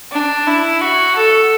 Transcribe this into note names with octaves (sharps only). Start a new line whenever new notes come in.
D4
E4
F#4
A4